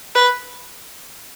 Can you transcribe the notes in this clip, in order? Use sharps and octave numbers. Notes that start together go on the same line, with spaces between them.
B4